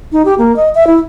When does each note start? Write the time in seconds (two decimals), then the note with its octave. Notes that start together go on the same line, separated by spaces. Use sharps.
0.12 D#4
0.25 G4
0.38 A#3
0.56 D#5
0.75 E5
0.87 E4